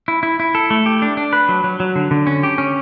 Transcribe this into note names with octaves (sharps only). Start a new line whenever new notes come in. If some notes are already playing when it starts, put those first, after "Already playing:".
E4
E4
E4
A4
A3
G4
D4
D4
B4
F#3
F#3
F#3
D3
D3
C#4
G4
C#4